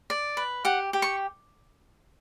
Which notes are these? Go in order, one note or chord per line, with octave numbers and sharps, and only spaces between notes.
D5
B4
G4 F#5
G4
C#6